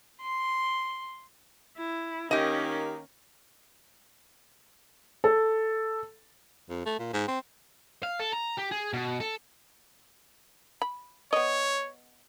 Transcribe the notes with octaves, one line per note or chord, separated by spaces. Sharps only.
C6
E4
D#3 A#3 C#4 D#4 G4 D#5
A4
F2
A3
A#2
G#2
C4
F5
A4
A#5
G4
G#4
B2
A4
B5
B3 C#5 D#5